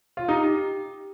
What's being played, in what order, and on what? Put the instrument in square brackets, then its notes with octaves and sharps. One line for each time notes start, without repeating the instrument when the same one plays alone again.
[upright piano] F4
[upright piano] D#4 [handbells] G4
[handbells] G4